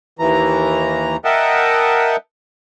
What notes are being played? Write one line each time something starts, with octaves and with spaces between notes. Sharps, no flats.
D#2 E3 A#5
A#4 D#5 E5 F#5 G5 A5